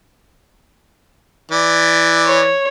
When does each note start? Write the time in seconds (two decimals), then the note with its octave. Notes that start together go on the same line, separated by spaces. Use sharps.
1.52 E3 D5
2.26 C#5